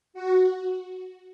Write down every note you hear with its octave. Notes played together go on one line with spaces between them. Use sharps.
F#4